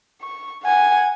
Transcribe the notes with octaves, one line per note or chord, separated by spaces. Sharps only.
C#6
F#5 G#5